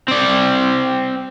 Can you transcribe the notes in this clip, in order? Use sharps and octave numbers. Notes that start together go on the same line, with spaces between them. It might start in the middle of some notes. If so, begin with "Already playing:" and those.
C4 D5